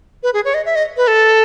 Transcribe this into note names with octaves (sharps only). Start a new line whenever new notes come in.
B4
G#4
C#5
D#5
E5
D#5
B4
A4